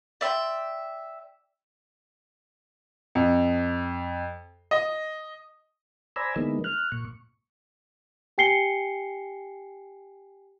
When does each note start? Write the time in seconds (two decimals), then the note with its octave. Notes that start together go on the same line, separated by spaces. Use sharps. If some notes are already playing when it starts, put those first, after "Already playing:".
0.21 D5 E5 G5 C6
3.15 F2
4.71 D#5
6.16 C5 D5 G#5 A#5 B5 E6
6.36 D3 E3 G#3 A#3 B3 D#4
6.64 F6 F#6
6.92 A#2 C#6
8.38 G4 G5 G#5 C7 C#7 G7